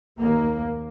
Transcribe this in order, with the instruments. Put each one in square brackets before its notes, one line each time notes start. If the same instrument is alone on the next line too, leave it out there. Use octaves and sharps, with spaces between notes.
[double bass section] D#2 A#3